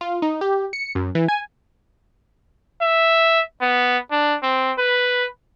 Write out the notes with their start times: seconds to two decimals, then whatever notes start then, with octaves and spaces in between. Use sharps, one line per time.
0.01 F4
0.22 D#4
0.41 G4
0.73 C#7
0.95 F#2
1.15 E3
1.28 G#5
2.82 E5
3.61 B3
4.11 D4
4.43 C4
4.78 B4